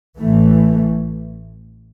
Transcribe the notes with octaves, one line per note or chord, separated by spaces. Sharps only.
A1 A2 E3 A3